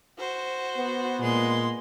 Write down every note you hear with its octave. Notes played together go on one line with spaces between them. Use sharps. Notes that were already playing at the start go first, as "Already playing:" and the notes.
F#4 C5
B3
A#2 G#3 C6